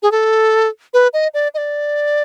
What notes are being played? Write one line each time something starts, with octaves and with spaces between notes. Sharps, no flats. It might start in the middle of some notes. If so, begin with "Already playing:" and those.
G#4
A4
B4
D#5
D5
D#5
D5